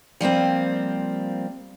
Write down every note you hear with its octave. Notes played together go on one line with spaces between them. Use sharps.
F3 G3 A#3 C4